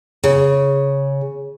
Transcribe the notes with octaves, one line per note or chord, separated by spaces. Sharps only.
C#3